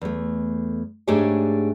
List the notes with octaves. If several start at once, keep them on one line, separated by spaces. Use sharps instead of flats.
E2 A3
G#2 A3 D4 G4 G#4 C#5